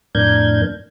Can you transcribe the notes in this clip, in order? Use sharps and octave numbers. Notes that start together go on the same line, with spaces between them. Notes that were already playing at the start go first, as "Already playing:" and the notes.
F2 A2 D4 A#4 G6 G#6